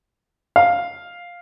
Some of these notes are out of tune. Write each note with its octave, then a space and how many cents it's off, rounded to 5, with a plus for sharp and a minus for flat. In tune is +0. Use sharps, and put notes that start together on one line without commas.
F5 +5